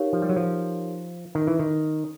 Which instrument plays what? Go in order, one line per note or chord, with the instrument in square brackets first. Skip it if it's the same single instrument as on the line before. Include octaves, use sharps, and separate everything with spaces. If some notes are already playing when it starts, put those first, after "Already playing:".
Already playing: [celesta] D#4 G4 A#4 C#5 F5
[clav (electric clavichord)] F3
G3
F#3
F3
D#3
E3
D#3